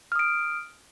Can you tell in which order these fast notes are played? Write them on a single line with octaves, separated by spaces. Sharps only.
F6 D#6 D7